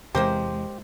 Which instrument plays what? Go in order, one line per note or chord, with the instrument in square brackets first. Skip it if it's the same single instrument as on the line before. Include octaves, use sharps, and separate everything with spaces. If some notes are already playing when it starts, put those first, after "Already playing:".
[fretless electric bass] E2 C3 E3 [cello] G#3 [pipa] A#3 A#4 C5 [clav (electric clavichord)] G4